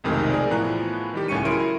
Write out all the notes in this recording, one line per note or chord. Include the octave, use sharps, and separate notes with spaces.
B1 F2 C3 D#3 G#3 A3
G#4 A#4 D5
A2 E3 F3 B3 A#5 F#6
D#3 G3 G4
C#2 A2 C#4 C#6 C#7 D#7
F#3 E4 G#4 A#4 C6 D7